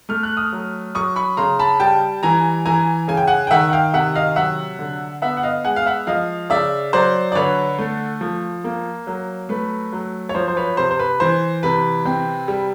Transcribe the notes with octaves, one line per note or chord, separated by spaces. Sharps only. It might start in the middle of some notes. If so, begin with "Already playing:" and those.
A3 F6
F#6
D#6 F6
F#3
F#3 C#6 D#6
B5 C#6
C#3 A#5 C6
A5 B5
G3 G5 A5
E3 G#5 A#5
E3 G#5 A#5
C#3 G#5
G5
F#5 G#5
G5
D#3 E5 F#5
F#5
F5 G5
C3 E5 F#5
D#5 F5
F#3 E5 F#5
D3
B3 E5 F#5
F#5
D#5 F5
G#3 F#5 G#5
F5
E5 F#5
F3 D#5 F5
C#3 D5 E5
F#3 C5 D5
D5
D3 B4 C#5
A3
F3
A#3
F#3
A3 B4
F#3
C#5
F3 C5
C5
B4 C#5
C3 C5
C5
B4
E3 C5
C3 B4
C4
G3